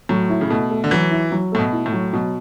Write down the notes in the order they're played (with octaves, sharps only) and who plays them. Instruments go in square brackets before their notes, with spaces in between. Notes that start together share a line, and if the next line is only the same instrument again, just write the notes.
[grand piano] A2 [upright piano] F#3
[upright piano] E4
[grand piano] C#3
[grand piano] B2 [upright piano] A3
[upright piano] A3
[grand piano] D3
[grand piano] E3 [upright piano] F#3
[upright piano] E4
F#3
[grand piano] A2 [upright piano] A3
[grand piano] B2
[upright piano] E4
[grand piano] A2
[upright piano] F#3
[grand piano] B2 [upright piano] F#3